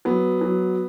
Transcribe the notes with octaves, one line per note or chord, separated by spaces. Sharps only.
F#3 B3
F#3